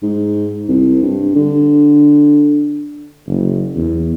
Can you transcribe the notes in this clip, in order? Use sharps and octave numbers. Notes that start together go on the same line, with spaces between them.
G#2
C2
G2
D3
F#1
E2